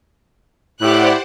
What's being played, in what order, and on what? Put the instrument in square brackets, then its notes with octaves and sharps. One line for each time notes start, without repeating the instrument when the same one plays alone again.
[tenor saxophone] A2 [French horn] E4 [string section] G4 F#6 [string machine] C5 D5 F#5